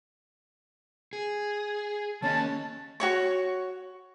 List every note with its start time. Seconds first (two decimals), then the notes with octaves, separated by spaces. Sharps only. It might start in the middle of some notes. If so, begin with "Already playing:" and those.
1.13 G#4
2.22 D#3 A#3 C#4 D#5 A5
3.00 F#4 C#5 C#6